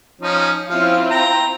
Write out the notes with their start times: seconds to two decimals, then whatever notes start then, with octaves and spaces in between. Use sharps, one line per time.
0.21 F3 C#4 D#4
0.69 F3 C4 C#4 E4 F4 F5
1.11 G5 A#5